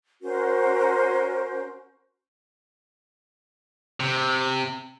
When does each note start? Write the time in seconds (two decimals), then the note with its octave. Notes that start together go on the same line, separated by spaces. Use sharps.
0.22 C#4 F#4 A#4 C5
4.00 C3